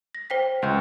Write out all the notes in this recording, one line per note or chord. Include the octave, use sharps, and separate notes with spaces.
A#6
C5 G5 B6
C#2 F#5 C6 G6